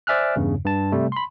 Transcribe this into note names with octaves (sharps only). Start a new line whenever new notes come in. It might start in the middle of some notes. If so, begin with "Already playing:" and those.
C5 D5 E5 G#5 F6 F#6
E2 G2 C#3
G2 A5
C3 G3 A3
B5 C6